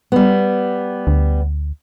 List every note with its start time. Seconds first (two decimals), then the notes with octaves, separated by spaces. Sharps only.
0.12 G3 B3
1.07 D2